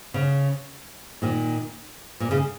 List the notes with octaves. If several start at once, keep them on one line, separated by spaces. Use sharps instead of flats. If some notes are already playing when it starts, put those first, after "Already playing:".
C#3
A#2 D#3
A#2
C#3